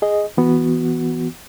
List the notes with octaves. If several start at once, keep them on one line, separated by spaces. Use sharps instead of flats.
G#4 D#5
E3 B3 F#4